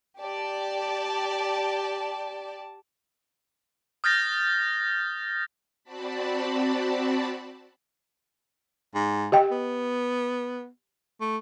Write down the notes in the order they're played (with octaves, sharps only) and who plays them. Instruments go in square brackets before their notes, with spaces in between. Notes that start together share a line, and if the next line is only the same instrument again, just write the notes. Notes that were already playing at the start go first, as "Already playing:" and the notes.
[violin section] G4 D5 A5
[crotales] D#6 F6 G6 A6 A#6
[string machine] C4 F#4 D5 A5 B5
[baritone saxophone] G#2
[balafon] G4 D#5 G5
[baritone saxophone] B3
A3